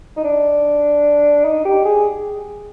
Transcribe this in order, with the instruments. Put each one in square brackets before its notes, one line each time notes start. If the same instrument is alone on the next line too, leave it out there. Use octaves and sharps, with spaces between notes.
[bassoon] D#4
D4
D#4
G4
G#4